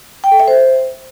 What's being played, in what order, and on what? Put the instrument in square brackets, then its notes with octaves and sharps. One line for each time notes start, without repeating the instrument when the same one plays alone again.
[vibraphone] G5
A4
E5
C5